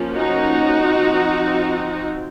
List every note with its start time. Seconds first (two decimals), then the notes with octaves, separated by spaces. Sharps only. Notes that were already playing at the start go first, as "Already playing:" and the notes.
Already playing: F3 A#3 C#4
0.15 D#4 F#4
0.82 F3 C4